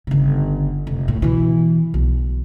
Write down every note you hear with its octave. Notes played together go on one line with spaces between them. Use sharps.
G1 C#3
F1
A2
B2 E3
B1